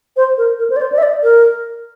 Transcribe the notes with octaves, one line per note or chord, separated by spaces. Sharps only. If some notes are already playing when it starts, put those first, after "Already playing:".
C5
A#4
A#4
C5
D5
C5
D5
E5
D5
A#4